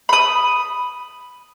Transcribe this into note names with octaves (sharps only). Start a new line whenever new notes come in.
B5 D#6